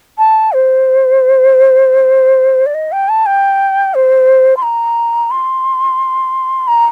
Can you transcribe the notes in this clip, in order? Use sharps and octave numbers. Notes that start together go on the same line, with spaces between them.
A5
C5
D5
D#5
G5
A5
G5
C5
C6
A#5
C6
A#5